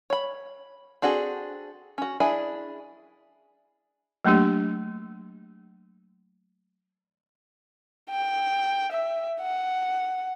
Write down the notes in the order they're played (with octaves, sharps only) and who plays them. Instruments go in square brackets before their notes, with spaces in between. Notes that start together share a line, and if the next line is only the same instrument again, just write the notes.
[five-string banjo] C#5 B5
C4 D4 F#4 G#4 A4
C#4 F#4
D4 E4 G#4 E5 G#5
[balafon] F#3 A3 A#3 D4 G4
[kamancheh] G5
E5
F#5